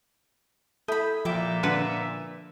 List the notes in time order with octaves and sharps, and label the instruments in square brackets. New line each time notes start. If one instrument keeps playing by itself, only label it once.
[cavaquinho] E4 B5 [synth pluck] A4 D#6 G6
[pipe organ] A#2 E5 [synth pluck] F3 [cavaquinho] E4 G5 D6
[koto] D3 B4